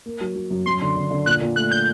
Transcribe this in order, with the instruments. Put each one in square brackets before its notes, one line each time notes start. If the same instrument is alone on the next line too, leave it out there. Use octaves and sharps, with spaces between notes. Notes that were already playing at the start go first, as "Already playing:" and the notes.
[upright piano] A#3
F#3
F#3
F#2
[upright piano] F#2 [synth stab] C6
[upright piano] D3
D3
D3
[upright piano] A#2 [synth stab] F#6
[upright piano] A#2
[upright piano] A3 [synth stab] F#6
[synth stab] G6